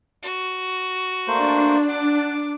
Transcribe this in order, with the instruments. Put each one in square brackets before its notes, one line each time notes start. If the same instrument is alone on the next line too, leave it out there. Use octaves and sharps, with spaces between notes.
[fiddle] F#4
[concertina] A3 A#3 C5 [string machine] D4
[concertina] F#5 [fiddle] D6